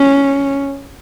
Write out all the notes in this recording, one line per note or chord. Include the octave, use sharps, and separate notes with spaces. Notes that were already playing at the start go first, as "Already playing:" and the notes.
Already playing: C#4